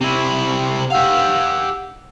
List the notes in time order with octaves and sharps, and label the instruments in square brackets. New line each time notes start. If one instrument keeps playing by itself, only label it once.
[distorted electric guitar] C3 E4
[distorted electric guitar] G4 F5 [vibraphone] F#5 E6